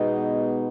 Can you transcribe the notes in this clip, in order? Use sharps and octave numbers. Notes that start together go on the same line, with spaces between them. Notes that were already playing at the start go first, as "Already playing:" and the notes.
Already playing: B2 G#3 B3 D#4